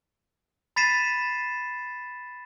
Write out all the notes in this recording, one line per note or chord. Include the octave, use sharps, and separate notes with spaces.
B5 A6 B6 C7 D#7 E7